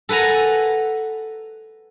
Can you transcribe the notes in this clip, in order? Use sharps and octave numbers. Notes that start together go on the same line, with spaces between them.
A4 B4 F#5 G#5 A#5